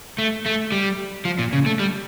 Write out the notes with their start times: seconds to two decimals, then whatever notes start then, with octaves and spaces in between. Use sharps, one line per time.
0.18 A3
0.46 A3
0.72 G3
1.25 F3
1.39 A#2
1.53 C#3
1.66 A3
1.80 G3